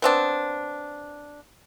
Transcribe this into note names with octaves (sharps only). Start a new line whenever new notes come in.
B3 C4 D4